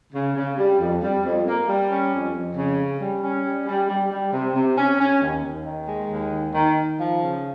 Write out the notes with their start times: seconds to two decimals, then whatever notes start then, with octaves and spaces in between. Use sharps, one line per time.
0.13 C#3
0.36 C#3
0.58 G3
0.79 F2
1.01 G3
1.24 F2
1.46 A#3
1.68 G3
1.90 C#4
2.12 F2
2.34 F2
2.56 C#3
2.78 C#4
3.00 G3
3.23 C#4
3.44 G3
3.67 G3
3.88 G3
4.11 G3
4.32 C3
4.54 C3
4.77 C#4
4.99 C#4
5.21 D#2
5.42 D#2
5.64 D#3
5.86 G#3
6.09 D#2
6.30 D#3
6.53 D#3
6.75 D#3
6.97 F3
7.19 C#3